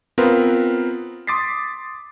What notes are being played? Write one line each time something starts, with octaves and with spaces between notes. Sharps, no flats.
B3 C4 F4 A#4 B4
C6 D6 D#6 A6 B6 C7